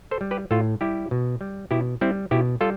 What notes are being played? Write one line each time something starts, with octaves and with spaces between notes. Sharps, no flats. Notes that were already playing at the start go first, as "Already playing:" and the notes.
A4 C5
G3
G4 B4
A2 F4 A4
G3 E4 G4
B2
G3
B2 E4 G4
G3 C4 E4
B2 E4 G4
G3 F4 A4